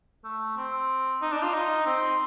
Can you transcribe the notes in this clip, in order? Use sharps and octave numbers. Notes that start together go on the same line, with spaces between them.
A3
C4
D#4
D4
F4
D#4
C4